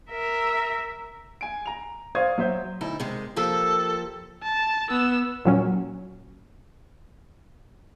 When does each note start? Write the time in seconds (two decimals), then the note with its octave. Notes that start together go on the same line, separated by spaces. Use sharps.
0.11 A#4 E5
1.41 G#5 D7
1.66 A#5 F7
2.15 C5 D5 F5 C#6 D#6 G#6
2.38 F#3 C5 E5 G6
2.81 D2 D#4 E4
3.00 C3 D#3 G#3
3.36 F3 A#3 G4 A4
4.42 A5
4.90 B3 E6
5.45 A#2 F#3 C#4